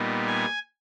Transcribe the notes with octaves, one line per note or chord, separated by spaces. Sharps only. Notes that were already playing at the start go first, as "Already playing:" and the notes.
Already playing: A#2 G3 B3 D#4
G#5